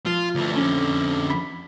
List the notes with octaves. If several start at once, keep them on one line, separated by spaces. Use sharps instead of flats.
F3 F4
D2 E3
F2 D3 C#4
B5 B6